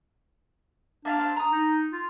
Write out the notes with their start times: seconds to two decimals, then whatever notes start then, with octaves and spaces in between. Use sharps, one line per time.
1.05 A#3 D4 E4 F4
1.19 C4 C6
1.36 A#5 D#6
1.52 D#4
1.92 F4